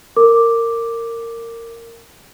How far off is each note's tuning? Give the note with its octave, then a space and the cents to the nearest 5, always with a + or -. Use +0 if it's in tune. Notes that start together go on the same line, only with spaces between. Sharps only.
A#4 -20 D6 +0